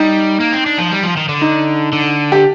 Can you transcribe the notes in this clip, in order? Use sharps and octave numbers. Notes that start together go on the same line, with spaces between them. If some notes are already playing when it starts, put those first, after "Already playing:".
Already playing: G3 D#4
A#3
C4
D4
F3
G3
F3
D#3
D3
D#4
D3
G4